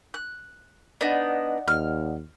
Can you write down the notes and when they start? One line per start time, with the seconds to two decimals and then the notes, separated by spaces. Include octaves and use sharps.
0.14 F#6
1.01 B3 D4 D#4 D5 D#5 F#5
1.68 D#2 F6